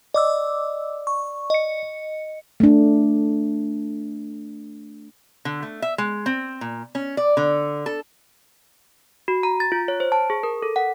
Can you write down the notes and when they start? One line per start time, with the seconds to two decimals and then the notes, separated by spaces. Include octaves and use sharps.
0.14 D5 D#5 D6 E6
1.07 C#6
1.50 D#5 C#7
2.60 A3 D4
5.45 D3
5.63 A3
5.82 E5
5.98 G#3
6.26 C4
6.61 A#2
6.95 C#4
7.17 D5
7.37 D3
7.86 A4
9.28 F#4
9.43 A#5
9.60 A6
9.72 F4
9.88 C#5
10.00 C5
10.12 A5
10.30 G#4
10.43 A#4
10.62 A4
10.76 F#5